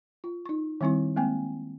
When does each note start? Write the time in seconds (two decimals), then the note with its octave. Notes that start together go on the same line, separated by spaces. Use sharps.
0.24 F4
0.46 D#4 C#6
0.81 D#3 G3 C4 E4 C#6
1.16 G#3 A#3 C4 G5 G#5